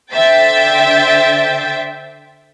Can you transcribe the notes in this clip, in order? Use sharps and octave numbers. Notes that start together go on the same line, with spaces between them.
D3 C5 E5 G5 A6